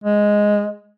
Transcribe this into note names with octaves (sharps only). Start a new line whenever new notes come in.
G#3